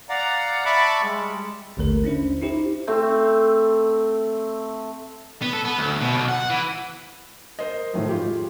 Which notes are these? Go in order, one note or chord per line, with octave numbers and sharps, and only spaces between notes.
D5 F5 F#5 A#5
D5 E5 A5 B5 C#6 D6
G3 G#3
A1 D#2 D3 A3 A#4
C#4 D4 E4 C5
D#4 E4 G4 C5
A3 C4
B3
A4
B3
D2
B2
B1
F#5
E3
A#4 C5 D#5
F2 A2 D#3
G#3 F4 G4